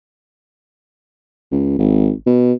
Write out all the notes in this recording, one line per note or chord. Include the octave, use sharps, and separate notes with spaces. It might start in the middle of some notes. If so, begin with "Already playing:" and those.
C#2
G#1
B2